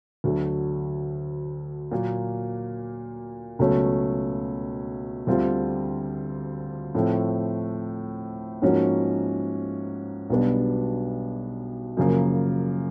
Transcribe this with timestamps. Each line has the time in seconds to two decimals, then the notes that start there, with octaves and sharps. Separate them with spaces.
0.24 D2 D3 F#3
1.91 A#2 F#3 A#3
3.59 C#2 B2 F#3 A3 C#4
5.27 D2 D3 G3 C4 F4
6.95 A2 F3 A3 C4
8.62 G#2 F3 A#3 C#4 F#4
10.30 B1 B2 G3 B3 D4
11.97 F#2 C#3 F3 A#3